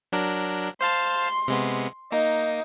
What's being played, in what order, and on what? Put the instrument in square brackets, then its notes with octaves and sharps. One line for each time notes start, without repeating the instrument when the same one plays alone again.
[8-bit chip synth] F#3 D4 A#4
[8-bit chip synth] C5 F5 A5 [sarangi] C6
[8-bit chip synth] C3 G#3 B3
[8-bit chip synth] A#3 [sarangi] D#4